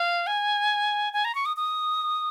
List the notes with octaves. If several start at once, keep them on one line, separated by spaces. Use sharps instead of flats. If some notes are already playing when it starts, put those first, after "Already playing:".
Already playing: F5
G#5
G#5
A#5
C#6
D#6
D#6